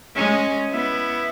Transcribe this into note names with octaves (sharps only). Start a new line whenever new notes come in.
G#3 C#4
B3 E4